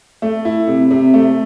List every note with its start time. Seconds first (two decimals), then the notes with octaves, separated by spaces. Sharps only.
0.22 A3
0.45 E4
0.68 C3
0.91 C3
1.14 A3